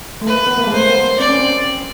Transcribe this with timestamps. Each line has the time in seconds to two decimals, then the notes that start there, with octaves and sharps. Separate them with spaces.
0.22 A3
0.27 A#3 B4
0.47 B3
0.58 A#3
0.67 G#3
0.74 A3 C5
0.82 A#3
0.90 B3
1.20 C4 D5
1.29 C#4
1.38 C4